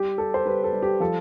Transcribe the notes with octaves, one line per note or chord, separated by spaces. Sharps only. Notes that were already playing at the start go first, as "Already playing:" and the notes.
Already playing: G3 G4
G3 A4
C5
G3 B4
A4
G3
G4
F3 A4